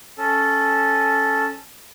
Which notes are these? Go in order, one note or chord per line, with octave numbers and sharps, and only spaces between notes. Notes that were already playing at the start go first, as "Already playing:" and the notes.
C#4 A4